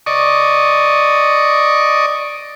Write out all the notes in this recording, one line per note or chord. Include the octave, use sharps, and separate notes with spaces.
D5 D#5 C#6